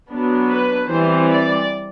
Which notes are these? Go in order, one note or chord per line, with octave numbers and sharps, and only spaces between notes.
F#3 B3 D4
B4
E3 G3 C4 C5
D5